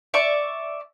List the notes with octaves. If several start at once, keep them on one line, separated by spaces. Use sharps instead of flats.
D5 E5 C#6